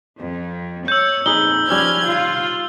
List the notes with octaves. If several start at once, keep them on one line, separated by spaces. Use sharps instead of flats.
F2
C#5 E6 G6
A#1 F2 D#4 G#4 B4 G7
F3 G3 C#4 D#4 F6 G#6
F4 F5